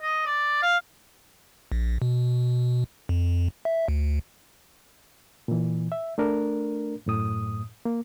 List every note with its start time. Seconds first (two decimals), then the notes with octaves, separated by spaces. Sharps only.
0.02 D#5
0.26 D5
0.62 F5
1.72 A#1
2.02 B2
3.09 F2
3.65 E5
3.88 D2
5.48 A#2 E3
5.92 E5
6.18 A3 D4 A#4
7.06 F#2 A2 D#6
7.85 A#3